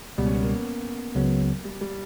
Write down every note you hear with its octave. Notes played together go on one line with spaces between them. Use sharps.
C#2 B2 G3 B3
C#4
B3
A#3
C#2 C#3 F#3 B3
G3
G3